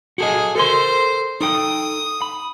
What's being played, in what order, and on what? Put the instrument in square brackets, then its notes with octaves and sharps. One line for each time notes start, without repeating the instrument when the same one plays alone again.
[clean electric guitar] F#4 A4 D#5 [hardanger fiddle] G#4
[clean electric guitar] A4 A#4 C6 [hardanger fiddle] C5
[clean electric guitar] D#4 A4 G5 [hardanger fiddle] D#6
[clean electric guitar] B5